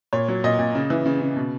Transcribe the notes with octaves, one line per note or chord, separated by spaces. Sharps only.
A#2 C#5
F#3
A#2 D#5
A#2
C#3
E3
C#3
C#3
B2